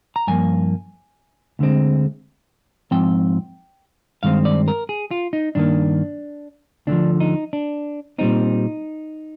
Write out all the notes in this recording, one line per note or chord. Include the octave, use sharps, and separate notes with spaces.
A#5
G2 F3 A#3 G#5
D2 D3 G#3 C4
G#2 F3 C4 G5
G2 D#3 G#3 C4 F5
D5
A#4
G#4
F4
D#4
G2 D#3 A#3 D4
D2 D3 F3 D4
D#4
D4
A#2 G3 C4 D#4